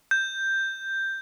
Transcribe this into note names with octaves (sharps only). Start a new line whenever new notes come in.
G6